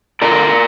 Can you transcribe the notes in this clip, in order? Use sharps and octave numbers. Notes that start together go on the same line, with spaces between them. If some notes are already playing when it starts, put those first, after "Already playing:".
D3 A#4 D5